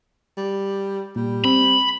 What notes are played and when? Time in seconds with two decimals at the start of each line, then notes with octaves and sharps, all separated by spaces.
0.37 G3
1.16 A#2 G3
1.45 C4 B5